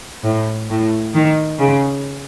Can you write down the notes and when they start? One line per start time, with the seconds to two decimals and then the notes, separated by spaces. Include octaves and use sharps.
0.23 A2
0.69 A2
1.14 D#3
1.59 C#3